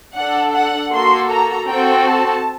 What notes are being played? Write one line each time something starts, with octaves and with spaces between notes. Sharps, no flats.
D4 A4 F#5
F#5
A#3 F#4 A4 C6
A#5
C4 F#4 A4 G5
A5